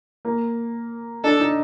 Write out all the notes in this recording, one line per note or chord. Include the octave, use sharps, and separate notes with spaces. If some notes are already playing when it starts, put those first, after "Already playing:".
A#3
D4 A4
D#4